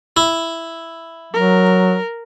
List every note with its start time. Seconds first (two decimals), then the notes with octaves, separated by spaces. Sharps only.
0.17 E4
1.33 F#3 A#4